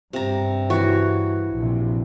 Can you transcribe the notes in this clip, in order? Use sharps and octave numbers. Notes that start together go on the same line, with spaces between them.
G2 C3 A#5
E3 F#4 C#5
A#1 C3